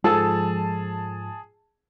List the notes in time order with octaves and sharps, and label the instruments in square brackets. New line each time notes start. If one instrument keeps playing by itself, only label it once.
[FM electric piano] G#2 F3 [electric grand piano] G#4 A5 [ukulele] A4